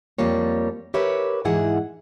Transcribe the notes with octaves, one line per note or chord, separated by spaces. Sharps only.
F2 F3 G3 A#3 C#5
G4 A#4 B4 C#5 E5
G#2 E3 E4 G#4 F#5